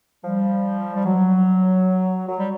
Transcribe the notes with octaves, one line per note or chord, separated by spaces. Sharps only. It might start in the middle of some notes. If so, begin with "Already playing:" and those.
F3 G3
G3
F#3
F#3
G3